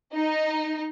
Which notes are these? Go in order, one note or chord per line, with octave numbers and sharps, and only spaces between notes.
D#4